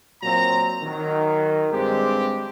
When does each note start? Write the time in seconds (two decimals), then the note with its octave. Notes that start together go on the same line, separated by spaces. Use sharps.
0.23 A#2 F#3 C4 A#5
0.83 D#3 F#3
1.72 G2 G#3 C4 D4 G4